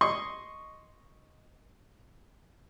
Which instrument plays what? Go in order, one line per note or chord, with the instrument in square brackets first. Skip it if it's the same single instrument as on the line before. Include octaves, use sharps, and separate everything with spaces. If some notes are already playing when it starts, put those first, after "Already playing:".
[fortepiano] D#5 C6 C#6